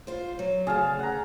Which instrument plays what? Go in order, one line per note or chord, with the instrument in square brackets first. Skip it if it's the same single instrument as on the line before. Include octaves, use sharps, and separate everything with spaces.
[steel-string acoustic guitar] F4 C5
F#3
[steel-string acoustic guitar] D2 C#3 [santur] G#4 F5 A5
[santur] F#5 A#5